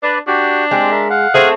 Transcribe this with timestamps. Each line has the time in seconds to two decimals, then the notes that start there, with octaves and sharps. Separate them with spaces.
0.03 D4 B4 D5
0.27 D4 F#4 G4
0.71 G#3 C4 G4 G5
0.91 A#4 E5
1.10 F5 F#5
1.34 A3 C4 G#4